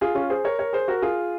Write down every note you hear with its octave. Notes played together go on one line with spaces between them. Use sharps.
F4 G#4
C#4 F4
G#4 C5
A#4 C#5
A#4 C#5
G#4 C5
F#4 A#4
F4 G#4